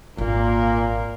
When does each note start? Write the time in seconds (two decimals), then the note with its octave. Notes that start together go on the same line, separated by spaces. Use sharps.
0.18 G#1 A#2 A#3